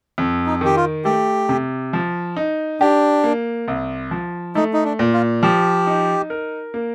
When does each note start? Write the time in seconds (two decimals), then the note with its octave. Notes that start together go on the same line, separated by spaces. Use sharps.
0.18 F2
0.46 D#4
0.61 D#3 G4
0.76 F4
1.05 A3 G4
1.49 C3
1.93 F3
2.36 D#4
2.80 D4 G4
3.24 A#3
3.68 C2
4.11 F3
4.55 A3 D#4
4.73 D#4
4.84 D4
4.99 A#2
5.13 F4
5.43 F3 G4
5.87 D#4
6.30 A#4
6.74 A#3